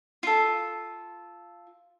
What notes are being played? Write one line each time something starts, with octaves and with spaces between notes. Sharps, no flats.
F4 A4